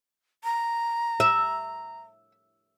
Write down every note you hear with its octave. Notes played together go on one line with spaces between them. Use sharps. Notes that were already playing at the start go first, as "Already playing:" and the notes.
A#5
E5